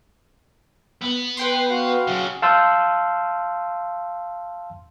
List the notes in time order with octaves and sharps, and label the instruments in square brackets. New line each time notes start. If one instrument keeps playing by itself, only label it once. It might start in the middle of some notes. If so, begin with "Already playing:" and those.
[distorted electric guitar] B3
[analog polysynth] B4 G5 C6
[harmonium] F#4 F5
[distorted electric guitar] C#3 F#3
[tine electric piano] F5 A5 C6 E6 G6